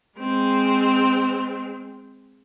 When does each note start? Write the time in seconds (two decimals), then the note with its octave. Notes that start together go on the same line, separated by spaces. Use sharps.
0.19 G#3 C4